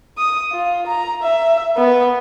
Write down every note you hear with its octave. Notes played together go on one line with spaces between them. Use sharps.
D#6
F4
A#5
E5
B3